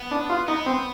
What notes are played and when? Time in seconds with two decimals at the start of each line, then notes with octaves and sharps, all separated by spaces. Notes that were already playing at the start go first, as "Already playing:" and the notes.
Already playing: B3
0.11 D4
0.30 F4
0.48 B3 D#4
0.66 C4